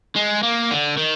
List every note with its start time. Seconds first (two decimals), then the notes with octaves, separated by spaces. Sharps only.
0.16 G#3
0.43 A#3
0.71 D3
0.97 D#3